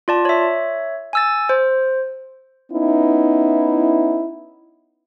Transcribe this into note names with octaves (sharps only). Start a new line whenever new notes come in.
F4 D5 A5
C#5 E5
G#5 E6 A6
C5
B3 C#4 D#4 E4